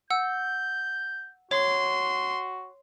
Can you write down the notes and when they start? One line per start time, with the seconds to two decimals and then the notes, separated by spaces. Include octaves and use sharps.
0.10 F#5 E6 G6
1.51 F#4 C#5 C6